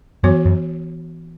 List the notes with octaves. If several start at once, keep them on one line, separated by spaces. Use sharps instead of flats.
F#2 E3 B3 F#4 C#5
F#2